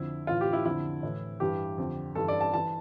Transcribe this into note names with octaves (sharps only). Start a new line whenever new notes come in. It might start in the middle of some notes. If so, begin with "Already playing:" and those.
Already playing: F2 D3 E4
A2 E3 F4
G4
E4
F2 D3 E4
A2 E3
G2 E3 G4
F2 D3
G2 E3 A4
D5
A5
E3 A5